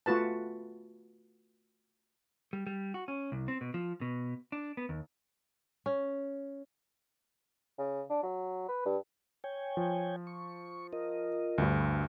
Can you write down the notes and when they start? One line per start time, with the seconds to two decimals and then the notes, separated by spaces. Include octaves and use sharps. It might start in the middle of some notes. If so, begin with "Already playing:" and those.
0.06 A3 F4 F#4 B4 A5
2.53 G3
2.67 G3
2.94 F#4
3.08 C#4
3.32 C2
3.48 C4
3.61 B2
3.74 F3
4.01 B2
4.52 D4
4.77 B3
4.89 D#2
5.86 C#4
7.78 C#3
8.10 D4
8.23 F#3
8.68 B4
8.85 G2
9.44 C#5 G5 G#5
9.77 F3
10.27 C#6
10.93 F4 A#4 D#5
11.58 D2 G2